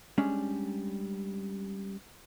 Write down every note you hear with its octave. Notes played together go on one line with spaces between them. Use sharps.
G3 G#3 C#4 D4